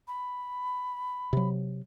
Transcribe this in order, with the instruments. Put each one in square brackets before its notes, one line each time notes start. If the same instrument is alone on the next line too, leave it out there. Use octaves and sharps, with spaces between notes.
[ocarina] B5
[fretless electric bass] C3 F#3